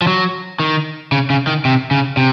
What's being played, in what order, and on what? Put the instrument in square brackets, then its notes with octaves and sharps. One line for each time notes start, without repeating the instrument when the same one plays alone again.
[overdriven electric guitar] F3
F#3
D#3
C#3
C#3
D#3
C3
C#3
C3